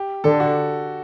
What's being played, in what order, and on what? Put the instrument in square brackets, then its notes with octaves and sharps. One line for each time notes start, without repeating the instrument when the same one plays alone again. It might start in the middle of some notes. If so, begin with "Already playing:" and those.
Already playing: [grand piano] G4
[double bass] D3 [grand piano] A4
[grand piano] F#4